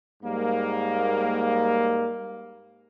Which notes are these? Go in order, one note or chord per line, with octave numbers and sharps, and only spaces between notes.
G#2 G3 A#3